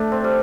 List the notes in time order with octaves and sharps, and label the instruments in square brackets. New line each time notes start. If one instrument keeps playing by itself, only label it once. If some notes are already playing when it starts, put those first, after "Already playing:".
Already playing: [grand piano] A3 [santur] D4
[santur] C4
G3